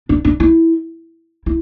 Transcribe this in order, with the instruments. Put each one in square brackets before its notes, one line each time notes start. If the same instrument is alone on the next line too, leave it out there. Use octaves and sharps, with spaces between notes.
[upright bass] D4
D4
E4
E4